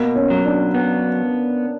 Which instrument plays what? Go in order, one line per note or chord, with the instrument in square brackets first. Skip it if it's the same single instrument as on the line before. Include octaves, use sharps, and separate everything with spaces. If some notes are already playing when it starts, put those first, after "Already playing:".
Already playing: [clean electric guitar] B2 [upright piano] A#3
[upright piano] C#4
[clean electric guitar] F#3
[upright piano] D4
[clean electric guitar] B3 [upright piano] C#4